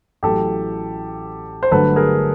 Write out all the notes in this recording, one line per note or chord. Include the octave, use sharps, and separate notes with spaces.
A1 A2 F#3 A3 G4 A4
C5
G1 G2 D3 F#3 A3 A4 B4
G#4 A#4